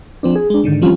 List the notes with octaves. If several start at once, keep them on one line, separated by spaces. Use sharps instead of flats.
F3 C4 D4
G#4
G#3 D4
G#2 D3 D#3
E3 F3 G3 C4 C#4 F4